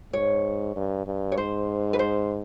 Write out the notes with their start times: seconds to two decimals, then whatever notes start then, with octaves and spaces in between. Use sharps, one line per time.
0.13 G#2 C#5
0.76 G2
1.07 G2
1.32 C#5
1.37 G#2 C5
1.93 B4
1.99 C5